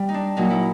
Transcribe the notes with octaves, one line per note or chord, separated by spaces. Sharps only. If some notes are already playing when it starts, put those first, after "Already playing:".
Already playing: G3
D#4
D4
A#2 F#3 D#4
E4